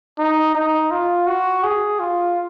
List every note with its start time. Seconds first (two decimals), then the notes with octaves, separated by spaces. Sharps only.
0.18 D#4
0.55 D#4
0.91 F4
1.27 F#4
1.64 G#4
2.00 F4